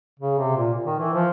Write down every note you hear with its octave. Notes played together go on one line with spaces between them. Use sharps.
C#3
C3
A#2
D#3
E3
F3